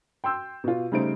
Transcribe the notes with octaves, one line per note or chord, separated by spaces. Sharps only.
G5 C6 E6 G6
B2 F4
C#3 G3 A3 D#4 C5 D7